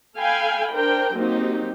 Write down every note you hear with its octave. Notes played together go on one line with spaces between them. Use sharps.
A4 F5 G5 G#5 B5
D4 A#4 C5 G5
F#3 A#3 C4 D#4 G4